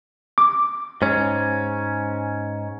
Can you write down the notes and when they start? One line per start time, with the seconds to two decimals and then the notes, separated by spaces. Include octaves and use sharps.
0.38 D6
1.02 G#2 C#4